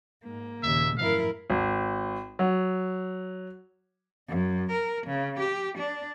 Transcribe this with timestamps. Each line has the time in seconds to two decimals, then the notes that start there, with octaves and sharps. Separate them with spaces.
0.23 G#2 A#3
0.63 D#2 A#2 C#3 E5
0.98 G#1 F#2 A2 F3 E4 A#4 F5
1.50 G#1
2.39 F#3
4.28 F#2
4.71 A#4
5.07 C#3
5.39 G4
5.78 D4